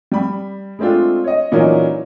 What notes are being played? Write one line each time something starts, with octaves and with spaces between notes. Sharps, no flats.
G3 B5
G#3 A3 C4 D4 F4
C#5 D#5
A#2 E3 F#3 C#4 D#4 A#4